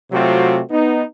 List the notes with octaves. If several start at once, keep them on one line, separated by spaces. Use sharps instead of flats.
C3 F#3 A3 C4 F4 F#4
B3 D#4